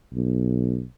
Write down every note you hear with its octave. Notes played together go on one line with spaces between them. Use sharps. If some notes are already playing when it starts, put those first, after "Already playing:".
B1